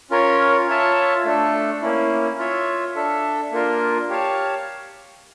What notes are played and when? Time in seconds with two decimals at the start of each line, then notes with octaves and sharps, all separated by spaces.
0.11 C#4 F4 A#4 C#5
0.68 F4 C#5 E5 A5
1.25 A3 D4 A4
1.82 A#3 C#4 E4
2.38 F4 C#5 E5
2.95 D4 A4 E5
3.51 A#3 D4 F4 A#4
4.09 G4 C#5 F5 A5